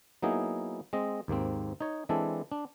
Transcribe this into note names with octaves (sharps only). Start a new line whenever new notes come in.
F#3 A#3 B3 D#4 E4 G#4
G#3 C4 D#5
D#2 G#2 A#3 C4
D#4 C#5
E3 G#3 C4 D4 E4 A4
D4